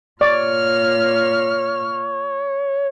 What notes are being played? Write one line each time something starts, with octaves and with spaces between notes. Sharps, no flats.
A#2 C#5 D5 F6